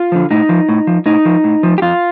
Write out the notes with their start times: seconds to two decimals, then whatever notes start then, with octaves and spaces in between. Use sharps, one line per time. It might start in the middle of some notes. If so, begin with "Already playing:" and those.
Already playing: F4
0.12 D3 F3
0.31 A2 D#4
0.49 F3
0.69 A2
0.87 F3
1.06 A2 D#4
1.25 F3
1.44 A2
1.63 F3
1.78 G4
1.82 F2 F4